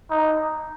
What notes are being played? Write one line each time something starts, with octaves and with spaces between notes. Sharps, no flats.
D#4